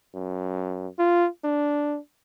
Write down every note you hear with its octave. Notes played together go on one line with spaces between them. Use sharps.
F#2
F4
D4